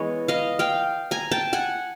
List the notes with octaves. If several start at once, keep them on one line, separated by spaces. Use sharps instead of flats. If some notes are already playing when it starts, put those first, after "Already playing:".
Already playing: E3 G#3 B3 C#5 D#5
D#5 F5
F5 G5
G#5 A#5
G5 A5
F#5 G#5